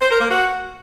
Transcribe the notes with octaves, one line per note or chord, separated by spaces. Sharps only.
C5
A#4
A#3
F#4